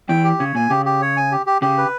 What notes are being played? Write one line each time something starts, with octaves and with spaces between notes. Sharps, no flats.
E2 E3 G5
G4
C#3 C#5
A#2 G#5
C#3 G4
G4
C#5
G#5
G4
G4
C#3 G4
B4